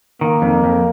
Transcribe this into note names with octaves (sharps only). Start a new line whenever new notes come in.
D#3 A#3
F2
F2